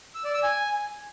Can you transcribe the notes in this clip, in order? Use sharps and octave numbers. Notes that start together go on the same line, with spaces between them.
E6
D5
E6
G#5